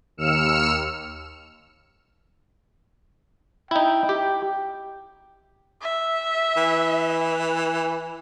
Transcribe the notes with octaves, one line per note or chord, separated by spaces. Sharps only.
D#2 E6 F6 C#7 E7
D#4 E4 G5
G4
E5
E3